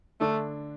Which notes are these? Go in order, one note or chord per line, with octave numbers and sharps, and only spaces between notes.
D3 A3 D4